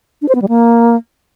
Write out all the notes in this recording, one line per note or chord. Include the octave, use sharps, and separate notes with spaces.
D4
C5
B3
G3
A#3